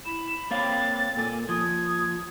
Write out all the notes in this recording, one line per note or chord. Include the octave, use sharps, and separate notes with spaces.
E4 B5 E7
A#3 C4 C#5 F5 A6
A#2 A#3 A4 G#5
F3 A#3 D#6 G#6